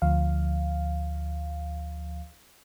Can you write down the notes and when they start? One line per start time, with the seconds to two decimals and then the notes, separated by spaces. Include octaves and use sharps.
0.02 D2 F3 F5